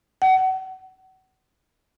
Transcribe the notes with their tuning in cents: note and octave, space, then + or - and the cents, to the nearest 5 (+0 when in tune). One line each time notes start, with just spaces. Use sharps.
F#5 +30